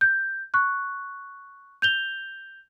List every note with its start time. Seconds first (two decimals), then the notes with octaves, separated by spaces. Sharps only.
0.01 G6
0.54 C#6 F#6
1.82 G6 F7 G7